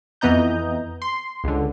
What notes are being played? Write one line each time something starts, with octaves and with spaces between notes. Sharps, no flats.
F2 E3 B3 D#5 A#5 G6
C6
C#2 D3